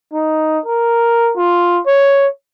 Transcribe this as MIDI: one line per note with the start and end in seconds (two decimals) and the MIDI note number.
0.14 0.59 63
0.66 1.32 70
1.37 1.80 65
1.87 2.27 73